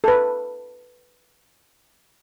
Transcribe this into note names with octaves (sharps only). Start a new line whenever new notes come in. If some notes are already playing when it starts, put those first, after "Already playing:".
A4 B4